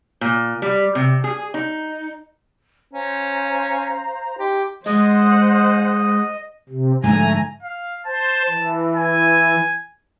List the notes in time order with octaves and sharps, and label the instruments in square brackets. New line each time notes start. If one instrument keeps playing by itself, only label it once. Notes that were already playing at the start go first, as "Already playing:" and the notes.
[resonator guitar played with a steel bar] A#2
G3
C3
G#4
D#4
[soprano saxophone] C#4 [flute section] C5 F5 A#5
[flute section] D#4 C6 [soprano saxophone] G4
[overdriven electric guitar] G#3 [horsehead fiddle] C5 F#5 [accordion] D#5
[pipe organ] C3
[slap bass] G#2 D3 F3 [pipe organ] A3 A#5 [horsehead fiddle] G#5
[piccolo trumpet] F5
[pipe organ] C5 [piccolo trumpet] A5
[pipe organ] E3
[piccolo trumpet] G#5